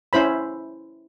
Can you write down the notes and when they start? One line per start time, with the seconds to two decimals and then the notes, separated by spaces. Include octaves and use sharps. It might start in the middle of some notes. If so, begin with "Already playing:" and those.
0.13 C#4 E4 C5 B5